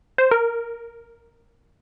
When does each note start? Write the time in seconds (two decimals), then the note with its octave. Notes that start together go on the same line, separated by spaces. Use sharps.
0.18 C5
0.31 A#4